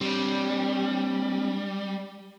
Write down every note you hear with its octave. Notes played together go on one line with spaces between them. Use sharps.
G3 C4 D4